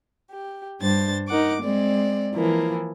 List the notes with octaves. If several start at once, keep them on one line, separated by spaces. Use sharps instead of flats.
G4
G2 G3 D4 C5 A6
D#4 A#4 F#5 D6
G#3 C4 D5
E3 F3 A#3 E4